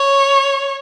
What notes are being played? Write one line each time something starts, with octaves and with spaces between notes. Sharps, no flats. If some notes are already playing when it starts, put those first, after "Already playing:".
Already playing: C#5